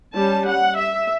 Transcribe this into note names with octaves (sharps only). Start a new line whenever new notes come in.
G3 C#4 A5
F#5
E5